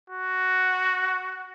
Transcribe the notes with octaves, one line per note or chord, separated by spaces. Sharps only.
F#4